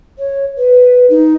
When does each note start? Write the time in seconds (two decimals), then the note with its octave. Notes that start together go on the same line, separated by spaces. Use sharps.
0.18 C#5
0.57 B4
1.09 D#4